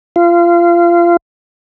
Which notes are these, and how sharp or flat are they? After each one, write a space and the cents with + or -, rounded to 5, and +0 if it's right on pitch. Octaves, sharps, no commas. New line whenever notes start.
F4 -25